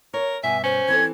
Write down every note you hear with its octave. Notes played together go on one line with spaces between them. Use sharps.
A#4 C#5
G2 B2 E5 G#5
C#4 C5
E3 C4 A4 G#6